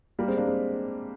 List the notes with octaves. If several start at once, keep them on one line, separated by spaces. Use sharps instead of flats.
G3 A#3
G#3 C4
A#3 D4
G#3 C4